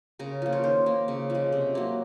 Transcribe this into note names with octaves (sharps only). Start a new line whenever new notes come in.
C#3 A#4
F3 A#3
C#5
D#3 C5
A#3
C#3
F3 G#3
C3
F#3 A#3